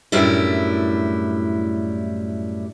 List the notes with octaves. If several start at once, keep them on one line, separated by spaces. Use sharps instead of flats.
F#2 A2 G3 D4 E4